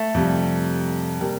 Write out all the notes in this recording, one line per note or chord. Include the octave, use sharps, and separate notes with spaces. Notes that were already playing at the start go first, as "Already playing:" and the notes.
Already playing: A3
F2 C3 G3
C3 G3 A#3